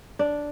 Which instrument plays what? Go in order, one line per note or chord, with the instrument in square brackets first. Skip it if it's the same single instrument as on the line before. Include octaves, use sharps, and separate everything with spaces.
[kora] D4